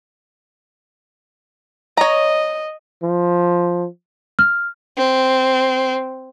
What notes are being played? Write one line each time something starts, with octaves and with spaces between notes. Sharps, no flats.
C#5 D#5 A#5
F3
F6
C4